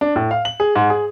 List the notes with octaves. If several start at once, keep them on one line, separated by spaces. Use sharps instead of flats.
D4
A2
F5
F#7
G#4
G#2
G#4